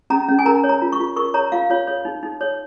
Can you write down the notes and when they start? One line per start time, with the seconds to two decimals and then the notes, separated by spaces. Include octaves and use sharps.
0.10 C#4 A#5
0.28 C#4
0.39 G#5
0.46 A#4 A#5
0.64 C#5
0.69 A#5
0.82 F4
0.92 C#6
0.99 F4
1.16 A#4 C#6
1.34 C#5 A#5
1.52 F4 F5
1.70 F4 C#5
1.87 C#5
2.05 D#4
2.23 D#4
2.41 C#5